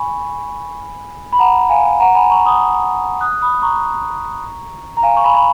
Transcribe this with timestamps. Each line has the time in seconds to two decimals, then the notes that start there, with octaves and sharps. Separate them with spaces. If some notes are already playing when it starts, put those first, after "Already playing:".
Already playing: G#5 B5 C#6
1.33 B5
1.39 F#5 A#5
1.69 F5 G#5
2.00 F#5 A#5
2.15 G#5 B5
2.30 A#5 C#6
2.45 B5 D#6
3.21 D#6 F#6
3.42 B5 D#6
3.62 A#5 C#6
4.97 A#5
5.03 F5 G#5
5.17 C#6
5.24 G#5 B5
5.34 B5